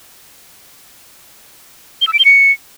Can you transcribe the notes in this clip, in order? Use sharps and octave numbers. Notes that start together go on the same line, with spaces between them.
G7
E6
D7
G7
C#7